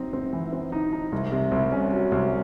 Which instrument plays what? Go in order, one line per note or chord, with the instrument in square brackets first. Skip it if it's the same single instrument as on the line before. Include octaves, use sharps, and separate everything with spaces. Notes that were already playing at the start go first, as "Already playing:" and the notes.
Already playing: [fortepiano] F#2 C4 D#4
C4
E3
C4
D#4
D#4
C2
C3
C2
C#4
F#3
C2